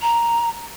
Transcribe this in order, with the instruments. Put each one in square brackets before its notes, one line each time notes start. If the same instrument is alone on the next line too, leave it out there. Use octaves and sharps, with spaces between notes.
[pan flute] A#5